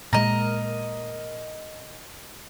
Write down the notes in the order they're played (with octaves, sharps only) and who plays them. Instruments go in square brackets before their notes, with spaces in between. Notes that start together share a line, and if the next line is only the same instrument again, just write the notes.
[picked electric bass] A#2 G#3 [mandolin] A#4 D#5